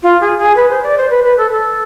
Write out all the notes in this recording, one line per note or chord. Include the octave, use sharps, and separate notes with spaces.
F4
G#4
G#4
B4
C5
D5
C5
B4
B4
A4
A4